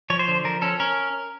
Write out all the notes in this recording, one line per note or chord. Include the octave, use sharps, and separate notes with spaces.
F3 C#5
C5
D3
F3 A#4
C#4 A4
C#4 A#4